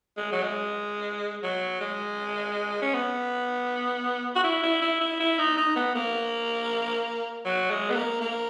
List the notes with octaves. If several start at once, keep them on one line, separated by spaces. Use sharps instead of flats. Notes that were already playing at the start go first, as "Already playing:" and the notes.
G#3
F#3
G#3
F#3
G#3
C#4
B3
F#4
E4
E4
E4
E4
E4
D#4
D#4
B3
A#3
F#3
G#3
B3
A#3
A#3